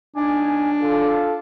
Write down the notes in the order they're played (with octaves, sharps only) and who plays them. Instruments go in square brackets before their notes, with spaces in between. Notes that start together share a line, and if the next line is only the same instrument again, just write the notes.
[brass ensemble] C#2 D#4 G#5 [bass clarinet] D4
[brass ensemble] F4 A4